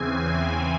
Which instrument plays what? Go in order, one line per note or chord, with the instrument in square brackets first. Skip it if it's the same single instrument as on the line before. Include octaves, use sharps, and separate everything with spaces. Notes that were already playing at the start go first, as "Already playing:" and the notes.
Already playing: [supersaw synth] E2 C#3 E3 C4 G#5